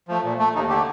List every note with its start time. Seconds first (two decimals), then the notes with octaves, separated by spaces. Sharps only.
0.08 F3 A3
0.24 A#2
0.39 A3
0.55 D#2 D#4
0.69 D3 A3 G4